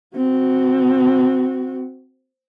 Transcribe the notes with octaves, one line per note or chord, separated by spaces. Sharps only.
C4 F#4